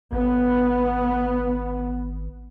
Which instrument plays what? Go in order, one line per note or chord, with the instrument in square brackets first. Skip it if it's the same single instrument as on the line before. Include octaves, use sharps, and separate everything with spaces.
[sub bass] G#1 [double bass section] B3